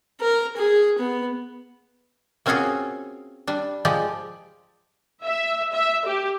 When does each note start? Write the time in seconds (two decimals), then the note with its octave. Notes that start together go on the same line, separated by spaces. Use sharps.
0.20 A#4
0.57 G#4
0.98 B3
2.46 A#3 C4 C#4 F4 F#4 G#4
3.47 G3 D4
3.85 F3 G#3 G4 D5
5.24 E5
5.73 E5
6.06 G4